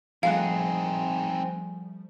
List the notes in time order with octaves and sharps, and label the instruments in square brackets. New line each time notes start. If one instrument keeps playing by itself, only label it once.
[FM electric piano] F3 G3 A3 [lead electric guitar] C4 D#4 [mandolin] G#4 F#5 [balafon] F5